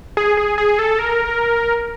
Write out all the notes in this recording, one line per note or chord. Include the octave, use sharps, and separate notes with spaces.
G#4
G#4
G#4
A4
A#4